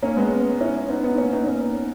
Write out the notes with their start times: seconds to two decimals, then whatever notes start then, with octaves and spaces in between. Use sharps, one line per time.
0.02 A#3 C#4
0.17 G#3 B3
0.60 C#4 E4
0.89 B3 D#4
1.04 B3 D#4
1.18 A#3 C#4
1.32 B3 D#4
1.46 A#3 C#4